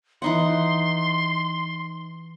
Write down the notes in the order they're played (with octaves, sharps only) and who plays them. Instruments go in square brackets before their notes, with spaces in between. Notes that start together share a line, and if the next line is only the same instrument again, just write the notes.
[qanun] E3 D#4 F#5 [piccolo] C6